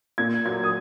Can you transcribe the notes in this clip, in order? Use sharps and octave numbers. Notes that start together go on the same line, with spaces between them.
A#2 G#6
F#3 G#6
D#6